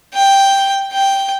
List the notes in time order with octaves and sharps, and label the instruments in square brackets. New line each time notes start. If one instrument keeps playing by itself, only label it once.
[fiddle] G5
G5